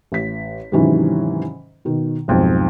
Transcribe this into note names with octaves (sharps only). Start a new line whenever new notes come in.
A1 B6
G#2 C3 D#3 E3 F#3 C#4
B2 D#3
B1 F2 G#2